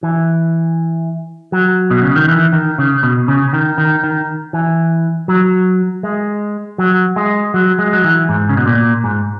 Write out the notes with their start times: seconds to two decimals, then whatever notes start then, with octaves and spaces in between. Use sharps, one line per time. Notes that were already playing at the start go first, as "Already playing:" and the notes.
0.03 E3
1.52 F#3
1.91 B2
2.03 C#3
2.16 D#3
2.28 E3
2.53 D#3
2.78 C#3
3.03 B2
3.28 C#3
3.53 D#3
3.78 D#3
4.04 D#3
4.53 E3
5.28 F#3
6.03 G#3
6.78 F#3
7.16 G#3
7.54 F#3
7.79 G#3
7.93 F#3
8.04 E3
8.29 G#2
8.49 C#3
8.57 B2
8.66 A#2
9.04 G#2